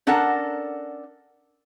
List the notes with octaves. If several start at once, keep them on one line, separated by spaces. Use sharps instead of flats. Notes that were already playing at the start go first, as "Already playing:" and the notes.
C#4 D4 A4 A#4 F#5